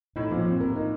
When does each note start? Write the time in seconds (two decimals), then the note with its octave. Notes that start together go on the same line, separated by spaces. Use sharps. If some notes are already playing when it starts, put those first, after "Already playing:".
0.16 A2 D#4
0.31 A#2 F3
0.46 C4
0.61 A#4
0.76 D#4